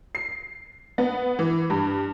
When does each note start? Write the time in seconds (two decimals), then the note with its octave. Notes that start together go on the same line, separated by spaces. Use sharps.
0.15 C7
0.98 B3
1.39 E3
1.70 G2